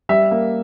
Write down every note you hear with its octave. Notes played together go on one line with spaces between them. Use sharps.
G3 E5
A#3